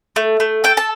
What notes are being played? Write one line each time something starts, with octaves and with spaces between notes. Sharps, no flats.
A3
A3
A4 G5
A5